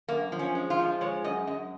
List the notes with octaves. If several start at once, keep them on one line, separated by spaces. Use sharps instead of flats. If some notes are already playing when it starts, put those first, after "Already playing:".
F#2 A#3
F3
C#4
G#3
F4
F3
G#3 C#5
F#2 D#5
F#2 D#5